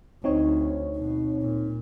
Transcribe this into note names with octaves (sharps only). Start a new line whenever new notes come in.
D2 C4 D#4 C#5
B2
A#2